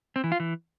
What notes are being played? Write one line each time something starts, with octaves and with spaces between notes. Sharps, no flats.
C4
E3
F4
E3